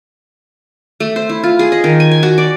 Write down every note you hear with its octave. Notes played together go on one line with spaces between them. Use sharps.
A3
C5
E4
F4
G#4
D#5
D#3
G#5
G#5
F#4
D5